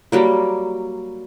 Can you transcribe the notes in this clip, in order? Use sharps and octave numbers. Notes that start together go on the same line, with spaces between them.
F#3 G3 A#3